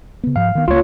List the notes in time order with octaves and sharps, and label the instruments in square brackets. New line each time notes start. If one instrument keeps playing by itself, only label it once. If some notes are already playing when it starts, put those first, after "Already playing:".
[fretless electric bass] C#3 B3
[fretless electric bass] G#2 F3 [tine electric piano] F5
[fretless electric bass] D#3 B3
[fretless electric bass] C#2 F3 A#3 [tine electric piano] F4 C#5